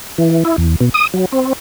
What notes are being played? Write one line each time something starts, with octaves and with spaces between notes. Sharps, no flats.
E3
E4
E2
B2
D#6
F#3
C4